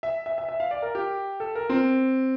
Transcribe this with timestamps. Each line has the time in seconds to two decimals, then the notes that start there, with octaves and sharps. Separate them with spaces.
0.03 E5
0.26 E5
0.38 E5
0.49 E5
0.60 F5
0.71 D5
0.82 A#4
0.95 G4
1.40 A4
1.55 A#4
1.69 C4